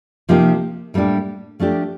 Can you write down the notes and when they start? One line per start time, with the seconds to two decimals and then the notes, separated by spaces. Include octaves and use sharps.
0.29 C3 F3 A#3 D#4 G4
0.94 A2 G3 A#3 D4 G4
1.60 F3 A3 D4 G4